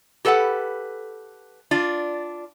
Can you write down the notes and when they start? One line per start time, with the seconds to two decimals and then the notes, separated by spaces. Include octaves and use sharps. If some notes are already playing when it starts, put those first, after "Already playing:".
0.25 G4 A4 B4 E5 F#5
1.71 D4 F4 D5